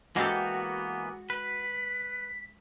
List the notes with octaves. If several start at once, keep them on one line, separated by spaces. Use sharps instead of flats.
E3 G#3 A#3 B3 F#4 G4 A4
B4 B6